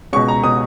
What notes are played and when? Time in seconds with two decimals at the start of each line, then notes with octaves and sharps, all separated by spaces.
0.13 C#2 B2 C#6
0.28 A#5
0.44 B2 D#6